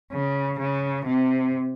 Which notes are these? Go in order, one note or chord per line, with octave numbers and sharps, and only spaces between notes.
C#3
C#3
C3